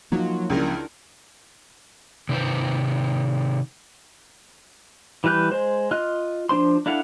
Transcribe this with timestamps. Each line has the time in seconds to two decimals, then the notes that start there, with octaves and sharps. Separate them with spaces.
0.12 F3 F#3 A#3 D#4 F4
0.50 C#2 C#3 D4 E4 A#4 D5
2.29 C3 D#3 B4 C5
5.24 E3 G3 B4 F#6 G6
5.52 G#3 C5
5.91 F4 D#5 F6 F#6
6.49 F3 D4 C5 C6
6.86 D4 E4 A4 F5 F#5